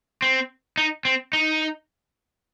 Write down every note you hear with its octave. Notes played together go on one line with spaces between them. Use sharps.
C4
D#4
C4
D#4